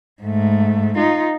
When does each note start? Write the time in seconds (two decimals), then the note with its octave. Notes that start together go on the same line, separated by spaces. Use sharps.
0.23 G#2 A3
0.97 D#4 F4